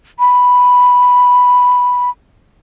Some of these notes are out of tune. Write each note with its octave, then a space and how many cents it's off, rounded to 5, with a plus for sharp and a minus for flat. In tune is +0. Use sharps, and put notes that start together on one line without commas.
B5 +0